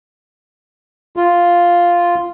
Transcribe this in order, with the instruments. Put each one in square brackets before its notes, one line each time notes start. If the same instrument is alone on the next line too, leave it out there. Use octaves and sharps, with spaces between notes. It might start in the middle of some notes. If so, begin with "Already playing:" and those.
[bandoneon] F4